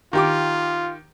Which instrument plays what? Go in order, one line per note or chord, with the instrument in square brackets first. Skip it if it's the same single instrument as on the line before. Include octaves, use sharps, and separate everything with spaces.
[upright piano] D#3 G4 D6 [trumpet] F4